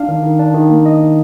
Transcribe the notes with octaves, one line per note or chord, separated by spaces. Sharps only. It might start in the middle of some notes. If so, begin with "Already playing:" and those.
Already playing: D4 F5
D#3
D#3
D4
D#3
A#3
D#3 D#5
D#3